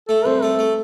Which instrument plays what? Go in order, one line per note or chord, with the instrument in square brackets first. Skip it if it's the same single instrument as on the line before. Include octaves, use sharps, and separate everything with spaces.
[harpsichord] A3 [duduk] A4
[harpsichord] C2 [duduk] C5
[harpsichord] A3 [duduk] A4
[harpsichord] A3